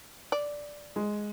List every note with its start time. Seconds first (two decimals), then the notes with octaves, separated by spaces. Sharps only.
0.32 D5
0.96 G#3